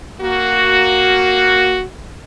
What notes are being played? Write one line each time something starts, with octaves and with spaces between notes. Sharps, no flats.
A#3 F#4